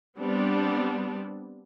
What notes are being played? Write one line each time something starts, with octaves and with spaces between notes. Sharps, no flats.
G3 B3 C4 D4